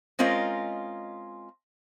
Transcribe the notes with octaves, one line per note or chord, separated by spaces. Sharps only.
G#3 C4 C#4 F4 A#4 D#5